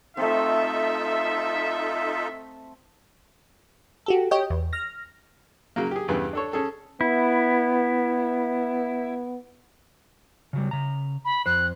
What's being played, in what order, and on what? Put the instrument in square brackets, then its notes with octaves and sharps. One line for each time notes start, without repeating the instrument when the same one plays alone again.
[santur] A3 C4 [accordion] D#4 F4 A4 [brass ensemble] E5
[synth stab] F#4 G4 A4
G4 C#5 D#5 G5
E2
F6 A#6
[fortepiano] C#3 F#3 A#3
G4 G#4
E2 G2 C#3 E3 B3
D4 A4 C#5
C#4 G#4 A4
[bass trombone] B3 [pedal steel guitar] E4
[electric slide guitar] C#3 F#3 G3
C#3 A#5
[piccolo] B5
[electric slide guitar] F2 C5 [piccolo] F#6